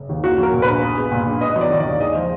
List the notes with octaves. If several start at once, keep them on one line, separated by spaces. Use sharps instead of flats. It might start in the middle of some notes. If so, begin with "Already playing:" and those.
Already playing: F#1
D#2
A#3 F#4
F#3 A#4
A#2
A#1 B4
B3
G#3
A#2
A#1
B3 D#5
F#3
D5
D#3
D5
D#2
G#3 D#5
F3